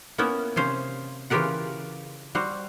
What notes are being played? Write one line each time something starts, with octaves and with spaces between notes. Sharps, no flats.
A#3 B3 C#4 E4
C3 C#4 C5 F5
C#3 E3 F4 G4 A#4 F#5
G3 F#4 C5